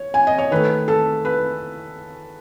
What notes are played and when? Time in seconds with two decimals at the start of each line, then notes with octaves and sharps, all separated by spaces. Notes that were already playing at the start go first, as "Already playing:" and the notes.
Already playing: C#5
0.14 G#5
0.27 D#5
0.38 C#5
0.51 D#3 A3 B4
0.88 A4
1.25 B4